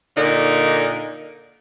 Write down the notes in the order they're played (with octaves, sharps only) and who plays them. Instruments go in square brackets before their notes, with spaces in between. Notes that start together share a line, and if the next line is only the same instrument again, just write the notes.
[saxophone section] A#2 D3 D#4 A#4